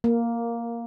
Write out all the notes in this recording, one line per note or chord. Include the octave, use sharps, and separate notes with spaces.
A#3